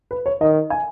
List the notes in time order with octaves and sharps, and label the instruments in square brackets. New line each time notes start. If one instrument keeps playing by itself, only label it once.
[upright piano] B4
C#5
[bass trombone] D#3 [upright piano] D#5
[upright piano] G#5